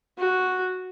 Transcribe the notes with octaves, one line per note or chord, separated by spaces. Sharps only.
F#4